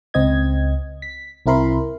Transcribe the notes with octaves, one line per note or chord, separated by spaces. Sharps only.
C#2 C4 D#5 G#6
B6
C2 C4 E4 A#4 B5 C6